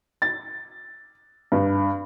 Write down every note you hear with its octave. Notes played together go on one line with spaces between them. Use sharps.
A6
G2